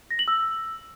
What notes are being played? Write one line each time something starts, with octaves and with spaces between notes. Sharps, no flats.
A#6
F#7
E6